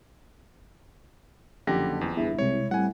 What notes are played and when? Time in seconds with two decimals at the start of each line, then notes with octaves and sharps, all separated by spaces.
1.67 F#1 F2 D3 G4 A#6
2.01 E2
2.17 G1 B3 E4 G#4
2.39 C2 C3 G#3 C#5
2.71 A2 G3 C4 F#5 G#5